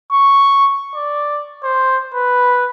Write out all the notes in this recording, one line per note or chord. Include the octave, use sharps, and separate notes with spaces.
C#6
D5
C5
B4